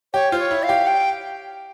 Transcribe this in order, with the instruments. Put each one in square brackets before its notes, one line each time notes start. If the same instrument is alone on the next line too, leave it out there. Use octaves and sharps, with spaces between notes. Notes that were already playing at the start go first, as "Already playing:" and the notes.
[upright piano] G4 [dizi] C#5
[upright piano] F4 [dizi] C5
[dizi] C#5
[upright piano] E4
[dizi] F5
[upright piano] G4
[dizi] G5